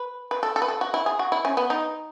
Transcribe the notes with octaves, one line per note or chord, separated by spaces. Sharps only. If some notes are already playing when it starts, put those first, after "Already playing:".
Already playing: B4
B4
A4
A4
B4
A4
F#4
E4
G#4
F#4
E4
C#4
B3
D#4